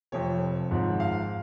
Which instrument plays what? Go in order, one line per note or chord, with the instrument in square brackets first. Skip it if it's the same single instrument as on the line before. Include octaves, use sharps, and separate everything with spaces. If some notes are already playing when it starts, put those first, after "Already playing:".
[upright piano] F1 F2 F3 C#5
G#1 G#2 F3
F5